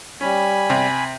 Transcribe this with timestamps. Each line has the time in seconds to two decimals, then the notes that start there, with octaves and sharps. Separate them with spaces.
0.21 G3 C#4 G#5 B5
0.70 C3